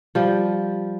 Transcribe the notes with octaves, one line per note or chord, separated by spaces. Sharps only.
F3 G3